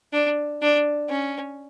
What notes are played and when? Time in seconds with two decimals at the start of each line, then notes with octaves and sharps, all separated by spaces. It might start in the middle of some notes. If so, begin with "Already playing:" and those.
0.13 D4
0.62 D4
1.10 C#4